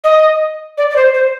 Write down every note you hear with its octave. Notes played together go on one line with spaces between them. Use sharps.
D#5
D5
D5
C5
C5